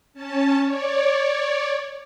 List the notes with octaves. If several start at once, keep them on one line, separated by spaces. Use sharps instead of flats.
C#4 A5
C#5 D5